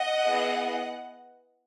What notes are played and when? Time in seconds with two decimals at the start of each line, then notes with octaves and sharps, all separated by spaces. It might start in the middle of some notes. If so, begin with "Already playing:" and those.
Already playing: D#5 F#5
0.25 B3 E4 G#4